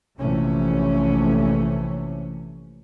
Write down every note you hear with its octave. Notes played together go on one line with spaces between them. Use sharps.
A#1 C3 E3 A3 C#4